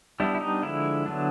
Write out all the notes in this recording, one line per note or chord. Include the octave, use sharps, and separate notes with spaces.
G3 B3 D4 E4
E4
D#4
D3 F3 G#3 E4
D3 F#3 B3 D4